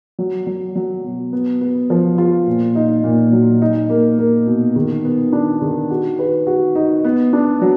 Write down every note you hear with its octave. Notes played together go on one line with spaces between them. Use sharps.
F#3
F#3
F#3
B2
B3
B3
F3
F4
A#2
D#4
A#2
F#3
D#4
A#3
A#3
B2
D#3
B3
D4
D#3
F#4
B4
F#4
D#4
B3
D4
F#3